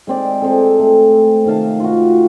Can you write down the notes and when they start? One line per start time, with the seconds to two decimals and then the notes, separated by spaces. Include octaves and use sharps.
0.07 G#3 C4 D5
0.41 C4 G#4 A4
0.79 A3
1.45 C3 D#3 F5 A5
1.80 F4 F#4